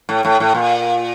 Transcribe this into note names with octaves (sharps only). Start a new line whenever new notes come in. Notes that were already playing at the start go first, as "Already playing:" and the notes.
A2
A2
A2
A#2